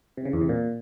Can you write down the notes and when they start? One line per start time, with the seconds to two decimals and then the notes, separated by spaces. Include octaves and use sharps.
0.17 C3
0.25 C#3
0.33 E2
0.41 C3
0.49 A#2